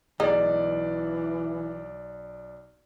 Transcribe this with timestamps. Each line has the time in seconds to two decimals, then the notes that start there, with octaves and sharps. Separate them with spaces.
0.20 B1 E3 G#3 D#4 D5